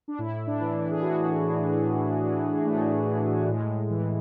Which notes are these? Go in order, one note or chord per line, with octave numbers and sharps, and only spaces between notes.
D4
A2 E4
D4
E3
E4
G#4
A2 F#4
E3
A2
E3
A2 A3
E3
A2 G#3
E3